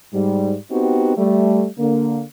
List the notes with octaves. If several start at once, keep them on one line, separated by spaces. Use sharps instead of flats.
G#2 G3
B3 C4 D#4 F#4 G4
G3 A3
D3 A#3